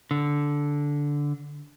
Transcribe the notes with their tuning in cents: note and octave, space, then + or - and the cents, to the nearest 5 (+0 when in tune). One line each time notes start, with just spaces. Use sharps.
D3 -10